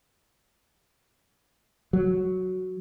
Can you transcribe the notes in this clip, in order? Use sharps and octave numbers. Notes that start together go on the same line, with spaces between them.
F#3